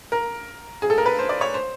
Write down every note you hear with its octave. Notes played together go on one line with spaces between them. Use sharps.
A#4
G#4
A4
A#4
B4
C5
D5
C#5
C5